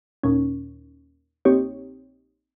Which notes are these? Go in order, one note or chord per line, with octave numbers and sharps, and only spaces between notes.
D#2 A#2 C#4
A#1 C4 D#4 G4 C#5